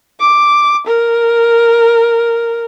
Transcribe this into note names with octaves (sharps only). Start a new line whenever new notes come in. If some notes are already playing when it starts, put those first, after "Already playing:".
D6
A#4